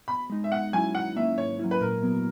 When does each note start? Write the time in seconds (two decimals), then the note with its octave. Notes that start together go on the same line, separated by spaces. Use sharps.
0.08 B2 B5
0.30 G#3 D#4
0.44 E5
0.51 B2 F#5
0.73 F#3 C#4 E4 G#5
0.95 D#3 F#5
1.16 A#3 C#4 E5
1.38 G#2 C#5
1.59 F#3 C#4 E4
1.71 B4
1.81 A#2 A#4
2.03 F#3 B3